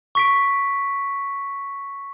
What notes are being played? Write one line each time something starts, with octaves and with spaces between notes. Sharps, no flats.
C#6 B6 D7